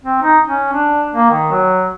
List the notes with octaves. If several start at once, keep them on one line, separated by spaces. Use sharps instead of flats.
C4
D#4
C#4
D4
A#3
D#3
F#3